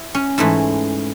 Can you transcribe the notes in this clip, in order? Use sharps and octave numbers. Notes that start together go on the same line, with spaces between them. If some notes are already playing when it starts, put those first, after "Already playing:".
Already playing: E4
C#4
G#2 E3 G#3 A3